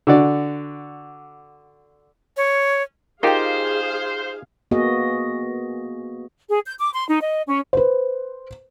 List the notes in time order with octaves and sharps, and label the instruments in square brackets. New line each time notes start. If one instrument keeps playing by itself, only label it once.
[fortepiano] D3 F#4 D5
[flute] C#5
[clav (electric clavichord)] D#4 F4 G4 [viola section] G#4 F5 [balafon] A#4 G5 [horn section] C5
[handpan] A#3 B3 F#4 G#4 D#5
[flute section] G#4
G6
D6
C6
D#4
D#5
C#4
[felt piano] B4 C5